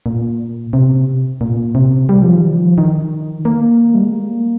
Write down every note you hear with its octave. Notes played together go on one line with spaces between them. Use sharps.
A#2
C3
A#2
C3
G3
F3
D#3
F3
D#3
A#3
G3
G#3
A#3